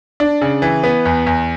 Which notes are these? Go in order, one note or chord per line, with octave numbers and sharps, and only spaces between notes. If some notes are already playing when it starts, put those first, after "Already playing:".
D4
C#3
E3
B3
E2
E2